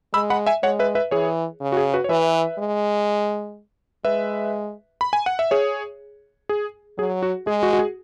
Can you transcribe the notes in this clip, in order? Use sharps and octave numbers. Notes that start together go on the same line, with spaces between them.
G#3 B5 E6
F#5 B5
E5 G#5
G#3 C#5 F#5
B4 E5
B4 E5
E3 G#4 C#5
C#3
F#4
G#4
F#4 B4
C#5
E3 B4 E5
G#3
G#3 B4 E5
B5
G#5
F#5
E5
G#4 C#5
G#4
F#3 G#4
F#4
G#3 G#4
F#4
F#4
G#4